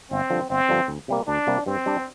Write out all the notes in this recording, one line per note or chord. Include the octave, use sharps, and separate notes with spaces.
G1 C4
G2 D3 F3
G1 C4
G2 D3 F3
D2
C3 G3 A#3
D2 D4
C3 G3 A#3
G2 C4
G3 D4